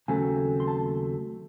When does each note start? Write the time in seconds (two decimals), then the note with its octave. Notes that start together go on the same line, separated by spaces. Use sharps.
0.08 D#2 C#3 F#3 A3 C4 G#5
0.60 C6
0.68 A5